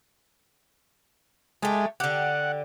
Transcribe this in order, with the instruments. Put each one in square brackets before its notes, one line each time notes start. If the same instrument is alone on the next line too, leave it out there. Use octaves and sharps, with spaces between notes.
[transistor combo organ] G#3 [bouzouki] A3 G4
[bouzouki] D3 G4 [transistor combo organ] F#5